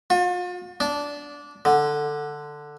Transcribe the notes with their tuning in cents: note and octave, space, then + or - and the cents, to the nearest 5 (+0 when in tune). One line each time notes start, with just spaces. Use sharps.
F4 +40
D4 -15
D3 +10